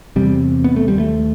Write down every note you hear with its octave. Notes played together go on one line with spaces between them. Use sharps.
E2 C3 G3
B3
A3
D#2 G3
A3